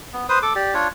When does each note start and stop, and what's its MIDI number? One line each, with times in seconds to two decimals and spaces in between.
0.13 0.27 59
0.29 0.39 71
0.29 0.39 72
0.29 0.39 87
0.42 0.53 69
0.42 0.53 86
0.55 0.74 67
0.55 0.74 74
0.74 0.88 62
0.74 0.88 65
0.74 0.88 73